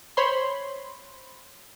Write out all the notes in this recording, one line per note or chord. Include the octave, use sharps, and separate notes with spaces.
C5 C#5 B5 C6